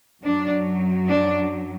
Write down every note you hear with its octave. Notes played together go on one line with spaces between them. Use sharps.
F#2 F#3 D4
D4